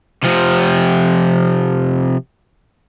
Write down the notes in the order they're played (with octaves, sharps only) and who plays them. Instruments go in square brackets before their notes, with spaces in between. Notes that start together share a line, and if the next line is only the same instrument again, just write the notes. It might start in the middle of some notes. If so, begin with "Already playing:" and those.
[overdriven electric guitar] C3 F3